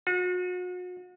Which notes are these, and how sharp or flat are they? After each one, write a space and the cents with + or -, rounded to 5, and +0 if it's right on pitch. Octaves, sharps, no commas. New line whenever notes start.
F#4 -40